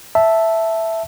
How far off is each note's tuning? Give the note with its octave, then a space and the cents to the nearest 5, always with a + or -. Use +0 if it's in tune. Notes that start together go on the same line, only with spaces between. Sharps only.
E5 +0 A5 +0